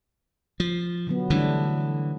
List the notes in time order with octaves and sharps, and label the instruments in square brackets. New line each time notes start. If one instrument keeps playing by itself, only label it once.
[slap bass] F3
[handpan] D3 F#3 B3
[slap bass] D3 E3 [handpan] G3 A3 D4